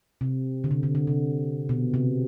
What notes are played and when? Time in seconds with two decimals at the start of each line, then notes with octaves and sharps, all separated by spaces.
0.21 C3
0.64 D3
0.71 C3
0.83 D3
0.95 D3
1.07 C3
1.69 B2
1.94 C3